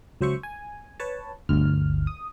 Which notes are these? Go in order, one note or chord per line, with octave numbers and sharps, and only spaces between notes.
C#2 F#3 C5 E5 C#6
G#5
B4 C#5 A5
G1 D2 F6
D#6